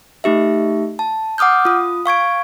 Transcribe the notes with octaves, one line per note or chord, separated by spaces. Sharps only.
A3 D#4 G4 E5
A5
F#5 D6 D#6 F6 G6
F4 D#6
F5 C#6 G#6 D7